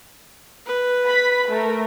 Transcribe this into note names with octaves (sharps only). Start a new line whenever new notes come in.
B4
B5 B6
A3 A#4